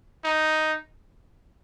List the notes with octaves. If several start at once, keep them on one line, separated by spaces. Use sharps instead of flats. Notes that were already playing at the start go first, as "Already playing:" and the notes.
D#4